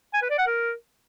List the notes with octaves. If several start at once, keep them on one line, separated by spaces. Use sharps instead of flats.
G#5
B4
D5
F#5
A#4